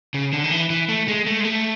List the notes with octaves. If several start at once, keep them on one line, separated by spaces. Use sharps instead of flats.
C#3
D3
D#3
E3
E3
A3
G#3
A3
G#3
A3